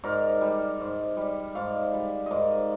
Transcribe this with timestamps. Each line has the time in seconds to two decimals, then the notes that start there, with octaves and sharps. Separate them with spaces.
0.04 G#2 A#4 D5
0.41 G3
0.80 G#2
1.17 G3
1.55 G#2 D5 F5
1.93 G3
2.26 G#2 A#4 D5 D#5